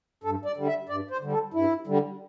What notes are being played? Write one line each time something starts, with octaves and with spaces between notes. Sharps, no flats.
G2 A4
D5
D3 G3
E5
G2 D5
C5
D3 G3
A4
G2 E4
D3 G3